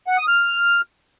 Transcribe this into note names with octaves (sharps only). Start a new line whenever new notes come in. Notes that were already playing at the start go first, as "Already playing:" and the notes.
F#5
D#6
F6